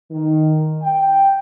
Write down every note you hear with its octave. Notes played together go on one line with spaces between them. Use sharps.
D#3
G5